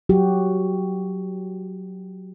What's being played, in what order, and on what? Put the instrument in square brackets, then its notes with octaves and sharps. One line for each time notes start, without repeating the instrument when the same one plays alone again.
[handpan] F#3 F#4 G4